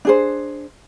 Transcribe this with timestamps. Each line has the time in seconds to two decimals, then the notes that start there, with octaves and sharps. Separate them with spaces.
0.05 D4 G#4 C5